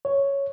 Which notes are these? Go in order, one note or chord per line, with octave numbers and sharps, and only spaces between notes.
C#5